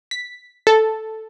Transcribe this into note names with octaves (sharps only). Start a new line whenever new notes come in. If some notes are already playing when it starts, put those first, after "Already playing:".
B6
A4